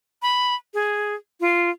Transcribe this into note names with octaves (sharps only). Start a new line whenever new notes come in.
B5
G#4
F4